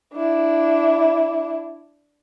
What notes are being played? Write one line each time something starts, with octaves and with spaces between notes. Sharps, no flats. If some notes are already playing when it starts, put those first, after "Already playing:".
D4 E4